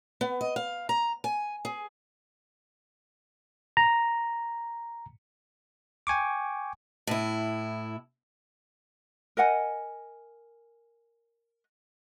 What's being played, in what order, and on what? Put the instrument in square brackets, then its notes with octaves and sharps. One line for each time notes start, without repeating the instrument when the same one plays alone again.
[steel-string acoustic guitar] B3
D#5
F5
A#5
G#5
G#4
[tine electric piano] A#5
G5 G#5 C#6 D6
[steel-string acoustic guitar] A2 E4
[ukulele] A#4 D#5 F#5 G#5